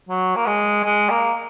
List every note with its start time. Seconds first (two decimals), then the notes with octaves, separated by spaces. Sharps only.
0.09 F#3
0.36 A#3
0.46 G#3
0.84 G#3
1.10 A#3